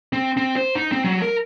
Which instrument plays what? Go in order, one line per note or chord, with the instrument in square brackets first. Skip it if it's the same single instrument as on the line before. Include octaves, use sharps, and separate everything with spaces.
[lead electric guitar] C4
C4
C5
D#4
C4
F#3
A#4